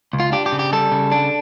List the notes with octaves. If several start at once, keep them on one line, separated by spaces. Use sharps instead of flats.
C#2
F4
D4 G4
G4
C#3
G4
G3 A4
C#3
D4